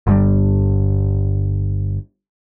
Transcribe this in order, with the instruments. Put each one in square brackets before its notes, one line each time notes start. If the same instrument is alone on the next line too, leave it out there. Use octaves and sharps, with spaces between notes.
[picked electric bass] G1 G2 G3